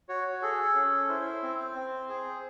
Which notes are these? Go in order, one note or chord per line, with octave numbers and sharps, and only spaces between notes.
F#4 C#5
G#4 A4
C#4
E4 C5
C4
C4
G#4